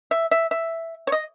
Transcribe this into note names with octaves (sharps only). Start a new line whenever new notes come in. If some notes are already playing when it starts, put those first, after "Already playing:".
E5
E5
E5
C#5
D#5